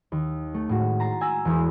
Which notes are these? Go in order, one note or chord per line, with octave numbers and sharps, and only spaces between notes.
D#2
A3
A2 G#3 F#4
A#5 C6 A6
G#5 E6 A#6
E1 E2